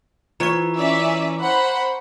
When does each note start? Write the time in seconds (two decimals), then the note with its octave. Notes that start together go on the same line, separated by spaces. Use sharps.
0.40 E3 F4 C#5 A#5 C#6
0.77 C#4 D5 E5
1.40 C5 F#5 B5